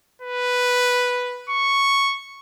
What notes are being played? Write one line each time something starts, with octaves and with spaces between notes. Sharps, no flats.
B4
C#6